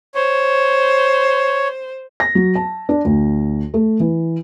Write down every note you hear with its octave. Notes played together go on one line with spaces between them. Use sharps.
C5 C#5
A#6
F#3
A5
D4
D2
A3
E3